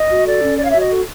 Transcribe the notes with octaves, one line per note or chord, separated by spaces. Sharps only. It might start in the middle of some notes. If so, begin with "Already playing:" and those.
Already playing: D#5
F#4
A4 D5
C#4
C#5 D5
F5
E5
F#4
D#5
A4